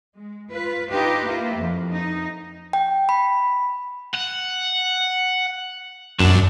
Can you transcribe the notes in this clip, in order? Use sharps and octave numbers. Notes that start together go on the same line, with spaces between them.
G#3
F4 B4
D#4 F4 G4 B4
A#3 E4 F4
F2
D#4
G5
B5
F#5
F#2 D4